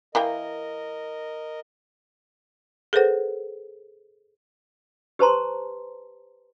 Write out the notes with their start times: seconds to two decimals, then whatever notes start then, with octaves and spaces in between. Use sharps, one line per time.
0.15 E3 A#3 A#4 D#5 G5
2.93 G#4 A4 B4 C5 F#5
5.19 G4 B4 C5 A5 A#5 C6